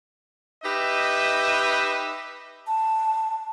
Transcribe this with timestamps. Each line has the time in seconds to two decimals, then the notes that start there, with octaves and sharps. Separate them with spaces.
0.64 D#4 G4 B4 D#5 E5
2.67 A5